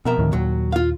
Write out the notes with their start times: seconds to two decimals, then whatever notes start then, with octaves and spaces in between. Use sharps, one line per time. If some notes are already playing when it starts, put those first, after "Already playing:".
0.05 F2 B2 A#4 E5
0.18 D2 A2 D#3
0.33 D#2 A#2 F#3
0.72 F4 F5